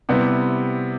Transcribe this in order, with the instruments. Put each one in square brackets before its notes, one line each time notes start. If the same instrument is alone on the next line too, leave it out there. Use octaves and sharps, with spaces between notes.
[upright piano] C3 G3 C4 E4 [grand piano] B3